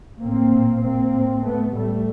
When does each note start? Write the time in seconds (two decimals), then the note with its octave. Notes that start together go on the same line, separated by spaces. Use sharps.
0.23 A2 A#3 C4
0.53 A#2
0.83 A#2 A#3 C4
1.13 A2
1.44 A2 A3 B3
1.74 A2 G3 A3